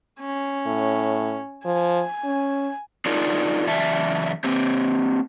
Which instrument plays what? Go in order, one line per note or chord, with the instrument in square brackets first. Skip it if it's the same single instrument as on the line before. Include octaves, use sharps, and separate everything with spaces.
[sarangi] C#4
[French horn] A2
[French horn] F3 [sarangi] G#5
[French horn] C#4
[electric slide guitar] D4 D#4 F4 G#4 A#4 D5
F#2 C#3 E3 D5 E5 A5
A#3 C4 G4 C5